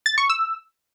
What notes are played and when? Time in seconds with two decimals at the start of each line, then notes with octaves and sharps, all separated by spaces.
0.06 A6
0.18 C#6
0.30 E6